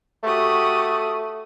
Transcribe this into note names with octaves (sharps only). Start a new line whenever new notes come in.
A3 F#4 G4 D#6